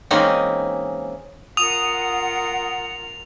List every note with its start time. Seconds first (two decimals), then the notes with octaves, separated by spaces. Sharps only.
0.11 E3 G#3 A#3 C4 C#4 D#4
1.57 F4 A#4 F#5 D#6 F7